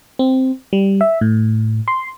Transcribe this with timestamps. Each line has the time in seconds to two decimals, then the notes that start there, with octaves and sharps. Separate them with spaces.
0.19 C4
0.73 G3
1.01 E5
1.21 A2
1.88 C6